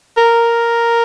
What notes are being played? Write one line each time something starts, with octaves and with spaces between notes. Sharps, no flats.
A#4